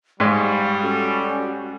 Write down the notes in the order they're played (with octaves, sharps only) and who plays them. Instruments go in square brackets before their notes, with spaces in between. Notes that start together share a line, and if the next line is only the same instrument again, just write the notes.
[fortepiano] G#2 G#3 [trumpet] G3 [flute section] F5 C#6
[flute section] C#4 F#4 A4